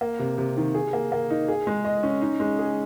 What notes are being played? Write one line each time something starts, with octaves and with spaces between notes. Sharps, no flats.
A#3
C3
C3
D#3
G#4
A#3
A#3
D#4
G#4
G#3
D#5
C#4
D#4
G#3
G#4